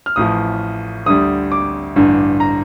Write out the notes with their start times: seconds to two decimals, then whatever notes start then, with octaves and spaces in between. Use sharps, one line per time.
0.06 F6
0.16 A1 A2 F3 D#6
1.06 D2 D3 G3 D#6
1.52 D6
1.96 A1 G2 D3
2.40 A#5